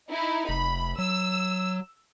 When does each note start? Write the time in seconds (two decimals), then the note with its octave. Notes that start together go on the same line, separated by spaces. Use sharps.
0.11 D#4 E4
0.49 F1 B5
0.99 F#3 E6